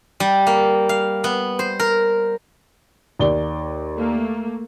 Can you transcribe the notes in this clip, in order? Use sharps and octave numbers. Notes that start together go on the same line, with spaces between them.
G3
A#3
F5
B3
C5
A#4
D#2 D5 G7
A3 A#3